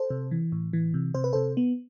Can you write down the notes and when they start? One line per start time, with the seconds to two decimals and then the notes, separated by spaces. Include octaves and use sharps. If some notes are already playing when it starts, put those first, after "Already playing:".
Already playing: A4 C5
0.10 C3
0.31 E3
0.52 A2
0.73 E3
0.94 C3
1.14 C3 C5
1.24 B4
1.33 C3 A4 C5
1.57 B3